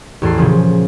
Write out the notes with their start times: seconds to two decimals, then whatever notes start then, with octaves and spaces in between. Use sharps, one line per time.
0.22 A1 E2 A4 C7
0.38 A#2 C#3 F3 C#4